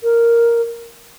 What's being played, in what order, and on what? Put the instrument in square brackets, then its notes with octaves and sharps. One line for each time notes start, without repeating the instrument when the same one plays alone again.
[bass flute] A#4